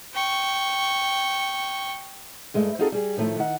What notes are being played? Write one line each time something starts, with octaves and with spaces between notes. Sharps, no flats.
G5 C#6
G2 G#3 A3
C4 D#4 F4 F#4 G#4 A4
G3 G#4
A2 D#3 F3 A3
D#3 F#5